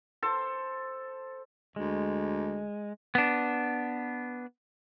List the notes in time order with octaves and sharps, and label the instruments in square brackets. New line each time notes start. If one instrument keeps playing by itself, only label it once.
[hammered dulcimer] A4 C5
[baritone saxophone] D2 [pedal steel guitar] G#3
[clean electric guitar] B3 D4